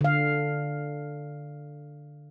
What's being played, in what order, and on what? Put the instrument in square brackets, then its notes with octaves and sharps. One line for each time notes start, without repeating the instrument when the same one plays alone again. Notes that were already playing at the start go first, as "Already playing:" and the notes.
[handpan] D3 F5